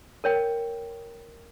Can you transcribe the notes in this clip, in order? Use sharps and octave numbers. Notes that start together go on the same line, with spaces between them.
A#4 C#5 G5